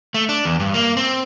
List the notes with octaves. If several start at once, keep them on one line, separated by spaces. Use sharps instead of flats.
A3
D4
E2
G2
A#3
C4